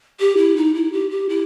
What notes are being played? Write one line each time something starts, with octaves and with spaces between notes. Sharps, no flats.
G4
E4
D#4
E4
G4
G4
E4